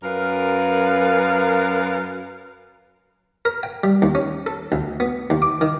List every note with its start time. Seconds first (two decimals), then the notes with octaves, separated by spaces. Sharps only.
0.03 F#2 A#4 B4 F5
3.45 A#4
3.63 G5
3.84 G3
4.02 D#2
4.15 C#4
4.47 A4
4.72 D2
5.00 B3
5.30 D#2
5.42 D6
5.61 D#3